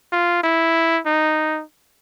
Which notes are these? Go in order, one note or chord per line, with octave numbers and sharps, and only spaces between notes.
F4
E4
D#4